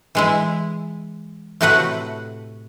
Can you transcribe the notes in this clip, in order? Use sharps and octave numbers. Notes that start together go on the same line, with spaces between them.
E3 G#3 E4
A2 C3 A3 F#4 B4 F#5